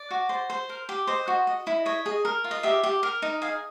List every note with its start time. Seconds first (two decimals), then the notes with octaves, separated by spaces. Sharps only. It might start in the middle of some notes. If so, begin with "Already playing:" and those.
Already playing: D5
0.11 F#4
0.29 C5
0.50 C5
0.69 A#4
0.89 G4
1.07 C5 D#5
1.28 F#4
1.47 D#5
1.67 E4
1.86 C#5 D#5
2.06 G#4
2.25 A#4
2.44 F4
2.51 D#5
2.63 G4 E5
2.83 G4
3.03 A#4
3.22 D#4
3.42 G#4 F5